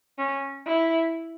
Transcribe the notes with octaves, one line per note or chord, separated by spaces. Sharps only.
C#4
E4